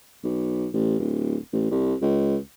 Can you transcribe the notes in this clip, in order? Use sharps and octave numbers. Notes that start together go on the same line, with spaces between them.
B1
A1
D1
A1
C2
C#2